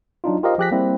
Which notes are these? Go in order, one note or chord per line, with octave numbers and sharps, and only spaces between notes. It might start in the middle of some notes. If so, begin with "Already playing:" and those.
F#3 D4 D#4 F4
F4 G4 A#4 C5 D#5 F5
F3 G4 G#4 F#6 A#6 B6
G3 A#3 C4 E4